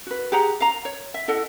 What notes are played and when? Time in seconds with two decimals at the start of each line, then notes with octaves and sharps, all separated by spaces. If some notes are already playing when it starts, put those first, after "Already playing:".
0.07 F#4 B4
0.32 G4 G#4 F#5 A#5
0.60 F5 A#5
0.85 C#5
1.14 E5
1.28 E4 A4 D#5 F#5